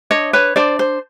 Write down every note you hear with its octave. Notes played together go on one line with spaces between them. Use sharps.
D4 C#5 D#5
B4 C#5
D4 C5 D5
C5